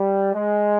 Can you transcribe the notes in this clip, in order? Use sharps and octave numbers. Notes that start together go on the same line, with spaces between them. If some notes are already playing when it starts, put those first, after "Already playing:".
Already playing: G3
G#3